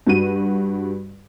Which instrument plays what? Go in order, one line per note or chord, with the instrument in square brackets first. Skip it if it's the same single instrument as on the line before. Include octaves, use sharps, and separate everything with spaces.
[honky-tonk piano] G2 F#4 D#7